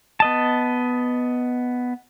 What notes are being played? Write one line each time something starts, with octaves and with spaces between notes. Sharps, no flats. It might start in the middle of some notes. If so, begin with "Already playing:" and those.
B3 D#5 A5